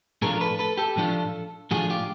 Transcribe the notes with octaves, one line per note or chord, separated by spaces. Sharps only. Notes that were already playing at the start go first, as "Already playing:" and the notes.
A2 F3 A3 D4 F4 G#4 A#4
A#4
A4 B4
A4 B4
G4 A4
A2 F3 A3 D4 F4
A2 F3 A3 D4 F4 F#4 G#4
F4 G4